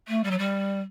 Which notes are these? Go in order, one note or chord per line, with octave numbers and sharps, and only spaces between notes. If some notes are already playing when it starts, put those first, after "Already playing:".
A3
G3
F#3
G3